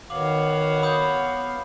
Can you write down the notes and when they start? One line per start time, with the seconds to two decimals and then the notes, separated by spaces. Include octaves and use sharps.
0.10 D#3 B3 F#4 C#5 F5 D6 F#7
0.83 B5 D#6 G6